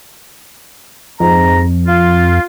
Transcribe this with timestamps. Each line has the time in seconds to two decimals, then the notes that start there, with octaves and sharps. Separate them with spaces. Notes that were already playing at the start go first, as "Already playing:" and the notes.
1.20 F2 G#2 A#5
1.87 F4